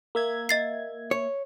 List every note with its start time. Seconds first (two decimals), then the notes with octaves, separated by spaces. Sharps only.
0.15 A#3 E5 G#6
0.49 D#5 A6 C7
1.11 C#5